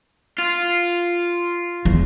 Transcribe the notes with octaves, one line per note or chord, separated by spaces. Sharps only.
F4
E2